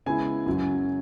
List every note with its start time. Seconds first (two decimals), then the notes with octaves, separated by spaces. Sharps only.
0.06 C#3 G#3 B3 E4 G#5
0.46 F#2 C#3 F#3